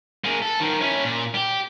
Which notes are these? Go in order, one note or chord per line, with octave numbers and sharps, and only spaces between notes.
A#3 G#4
A4
D#3 F3
C#4 E4
A#2
G4